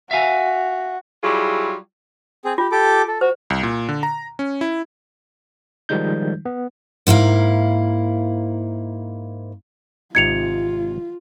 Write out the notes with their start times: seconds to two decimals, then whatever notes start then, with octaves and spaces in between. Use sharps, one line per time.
0.11 F#4 E5 F5 G#5
1.23 F#3 G3 E4 F4 G4 G#4
2.45 C4 G#4
2.58 F4 G4
2.72 G4 A4 D6
3.08 A4
3.21 F#4 C5
3.50 C2
3.63 A#2
3.89 D3
4.03 A#5
4.39 C#4
4.61 E4
5.89 D#3 F3 G3 G#3 D#4 G6
6.45 B3
7.07 G#2 A#3 E4 F5
10.15 G#1 C3 D#4 F4 G#6 C#7 F7